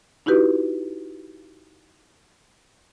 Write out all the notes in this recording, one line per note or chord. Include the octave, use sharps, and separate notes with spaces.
D#4 E4 F#4 G4 B4